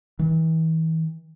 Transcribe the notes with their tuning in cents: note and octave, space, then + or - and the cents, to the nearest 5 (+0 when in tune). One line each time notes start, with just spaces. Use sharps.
E3 -40